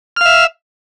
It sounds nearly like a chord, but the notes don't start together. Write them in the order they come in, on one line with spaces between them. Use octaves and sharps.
F6 F5 E5